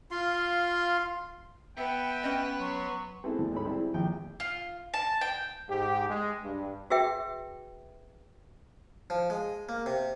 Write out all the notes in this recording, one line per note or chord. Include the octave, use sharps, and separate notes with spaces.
F4 F5 C6
B3 E5 G5
C#4 D#5
F#3 C6 C#6
G#3 B3 C4 E4 G#4 A4
D2
G#2 A4 C#5 B5
G3 G#3 C4 E4
A#1 D#2 G5
F4
A5
G5
G#2 G4
G#3
G2
F#4 G#4 B4 E5 G5
F3
G#3
A#3
C3